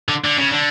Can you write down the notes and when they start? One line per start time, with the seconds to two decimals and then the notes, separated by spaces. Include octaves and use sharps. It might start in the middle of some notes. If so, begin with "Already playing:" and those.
0.09 D3
0.24 D3
0.38 C#3
0.51 D3